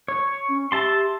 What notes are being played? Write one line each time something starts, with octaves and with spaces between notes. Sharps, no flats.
C#5
C#4
G4 E5 A5 C6